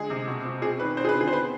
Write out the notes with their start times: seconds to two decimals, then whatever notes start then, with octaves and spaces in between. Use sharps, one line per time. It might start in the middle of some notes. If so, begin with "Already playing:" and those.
Already playing: D3 G#3 G#4
0.10 C3
0.27 B2
0.45 B2
0.62 C4 G#4
0.80 D#3 B4
0.97 C4 C5
1.05 G#4
1.09 B4
1.15 D3
1.20 G#4
1.27 C5
1.33 B3 B4